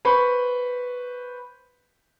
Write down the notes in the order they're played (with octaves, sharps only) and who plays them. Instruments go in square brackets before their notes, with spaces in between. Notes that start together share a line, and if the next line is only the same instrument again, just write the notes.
[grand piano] B4 C5 B5 C#6